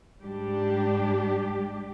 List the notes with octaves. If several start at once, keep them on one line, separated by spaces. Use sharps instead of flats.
G#2 G3 D4 G4